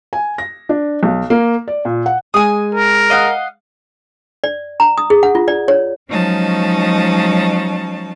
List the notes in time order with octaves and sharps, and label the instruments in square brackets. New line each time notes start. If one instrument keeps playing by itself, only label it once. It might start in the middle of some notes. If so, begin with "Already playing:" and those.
[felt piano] G#5
A#6
D4
B1
A#3
D5
A#2
F#5
[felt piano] G#3 [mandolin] G#5 D#6
[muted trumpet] A#4
[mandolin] D#5 F5 F#5
[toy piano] D5
A#5
D#6
G#4
F#5
F4
D5
C#5
[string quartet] F3 F#3 G#3 C#4 D#4 A5